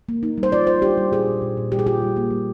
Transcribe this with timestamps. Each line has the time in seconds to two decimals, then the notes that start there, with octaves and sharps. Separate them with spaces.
0.09 A#3
0.23 D#4
0.38 G3
0.43 C5
0.52 F4 D5
0.67 F4 C5
0.82 D4 G4
0.98 G3
1.12 A#2 G#4
1.27 A#2
1.42 A#2
1.57 A#2
1.71 G3 G4
1.79 G#4
1.86 F4 G4
2.02 G3
2.16 A#3
2.31 G3